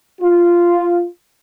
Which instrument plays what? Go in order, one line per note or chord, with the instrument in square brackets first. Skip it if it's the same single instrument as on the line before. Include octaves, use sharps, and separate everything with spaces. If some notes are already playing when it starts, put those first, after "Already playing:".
[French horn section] F4